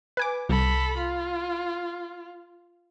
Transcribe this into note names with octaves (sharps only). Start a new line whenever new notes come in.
B4 G#5 D6
C2 A4 B5
F4